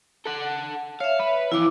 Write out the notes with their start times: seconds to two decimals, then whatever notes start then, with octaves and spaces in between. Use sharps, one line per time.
0.25 A4 F#5
1.00 C#5 E5 F5
1.20 B4
1.52 F2 E3 E4 D6